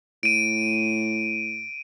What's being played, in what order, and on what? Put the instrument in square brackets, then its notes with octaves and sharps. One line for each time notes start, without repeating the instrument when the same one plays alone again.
[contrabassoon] A2 [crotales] D7 D#7